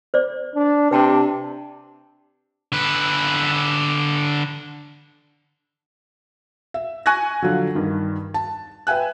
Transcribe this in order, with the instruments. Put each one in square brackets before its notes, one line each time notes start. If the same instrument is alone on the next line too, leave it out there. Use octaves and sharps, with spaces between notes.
[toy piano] C5 D5
[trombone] D4
[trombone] C3 [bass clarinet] D4 [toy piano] B4 G5 A5
[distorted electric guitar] D3 B4
[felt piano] E5
G#5 C#6 F#6 G#6 A#6
D3 F3 F#3
G2 D#3
A5
B4 E5 G5 G#5 F#6